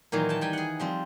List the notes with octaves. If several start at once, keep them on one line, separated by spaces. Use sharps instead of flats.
A#2 D#3 E3 F#3
G5 A5
G3 G5 G#5
G#4 F#5
F3 G3 C4